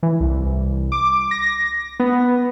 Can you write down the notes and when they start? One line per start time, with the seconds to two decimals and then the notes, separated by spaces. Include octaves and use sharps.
0.03 E3
0.20 C2
0.92 D6
1.31 A#6
2.00 B3